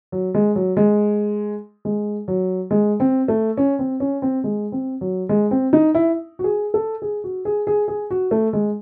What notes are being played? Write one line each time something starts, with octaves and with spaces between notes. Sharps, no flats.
F#3
G#3
F#3
G#3
G#3
F#3
G#3
C4
A3
C#4
C4
C#4
C4
G#3
C4
F#3
G#3
C4
D#4
E4
F#4
G#4
A4
G#4
F#4
G#4
G#4
G#4
F#4
A3
G#3